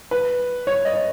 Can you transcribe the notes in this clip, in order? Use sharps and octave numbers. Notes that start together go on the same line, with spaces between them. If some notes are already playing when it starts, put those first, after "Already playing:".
B4
C#5
D#5
C#5